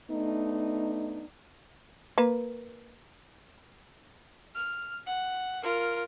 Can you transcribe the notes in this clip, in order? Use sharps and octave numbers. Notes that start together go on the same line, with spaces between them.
A3 B3 D4 D#4
A#3 B4
F6
F#5
F4 A#4